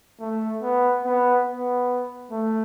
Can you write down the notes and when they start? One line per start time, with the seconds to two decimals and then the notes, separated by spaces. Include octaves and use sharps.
0.20 A3
0.62 B3
1.05 B3
1.47 B3
2.31 A3